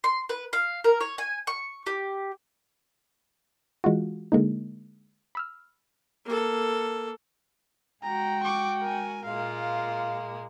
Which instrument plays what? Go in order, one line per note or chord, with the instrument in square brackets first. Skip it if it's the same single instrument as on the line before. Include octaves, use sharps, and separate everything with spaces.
[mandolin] C6
B4
F5
A#4
C#5
G#5
C#6
G4
[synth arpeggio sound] E3 G#3 F4 F#4
D3 G#3 A#3 D#4
B5 E6 F6
[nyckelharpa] A#3 A4
[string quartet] G#3 F#4 [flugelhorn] G5 [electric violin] A#5
[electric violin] C#6 D6
A#4 G#5
[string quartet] A#2 G#3 A#3 [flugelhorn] F4 [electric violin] F5